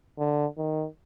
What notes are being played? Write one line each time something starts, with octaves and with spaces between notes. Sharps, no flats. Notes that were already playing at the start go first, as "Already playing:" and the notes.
D3
D#3